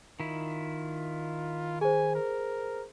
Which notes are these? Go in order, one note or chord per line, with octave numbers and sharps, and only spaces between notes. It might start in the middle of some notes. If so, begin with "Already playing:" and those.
D#3 E4 F4
G#4 C5 G#5
A#4